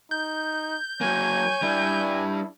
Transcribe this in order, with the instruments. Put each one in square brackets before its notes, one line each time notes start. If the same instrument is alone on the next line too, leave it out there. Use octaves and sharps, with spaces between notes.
[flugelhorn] D#4 [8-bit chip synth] G6
[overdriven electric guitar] F#3 A#3 [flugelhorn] C#5 [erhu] G#5
[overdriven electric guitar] G3 D4 [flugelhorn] E4